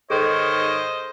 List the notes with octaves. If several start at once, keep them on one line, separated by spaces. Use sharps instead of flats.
G#2 D#3 G#4 A4 C5 C#5 D#5